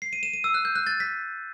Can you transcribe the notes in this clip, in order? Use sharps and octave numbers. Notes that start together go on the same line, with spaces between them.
C7
D#7
E7
D#7
E6
F#6
G6
F#6
A6
B6